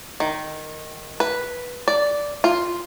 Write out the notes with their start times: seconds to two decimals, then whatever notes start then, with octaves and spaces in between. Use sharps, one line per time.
0.20 D#3
1.20 B4
1.88 D5
2.44 F4